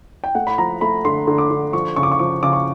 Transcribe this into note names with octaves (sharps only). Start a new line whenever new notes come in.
G5
A3 F#5
B5
F3 A#5
A3 B5
D3 C6
D3
D6
D3
F3 C#6
C#3 C#6
D6
C#6
F3 D6
C#3 D6
C#6